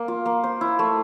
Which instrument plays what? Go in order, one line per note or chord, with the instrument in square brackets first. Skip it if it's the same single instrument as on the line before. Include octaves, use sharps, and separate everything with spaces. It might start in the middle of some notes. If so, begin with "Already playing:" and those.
Already playing: [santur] A#3
F4
A#3
C5
E4
A3